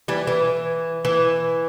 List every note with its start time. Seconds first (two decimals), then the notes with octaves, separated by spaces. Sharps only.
0.08 E3 G3
0.27 E3
1.05 E3